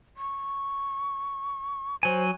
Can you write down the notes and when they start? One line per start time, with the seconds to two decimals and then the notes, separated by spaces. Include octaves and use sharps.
0.17 C#6
2.03 F#3 C5 G#5